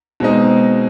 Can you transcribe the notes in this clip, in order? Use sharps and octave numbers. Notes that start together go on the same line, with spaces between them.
B2 G#3 C4 D#4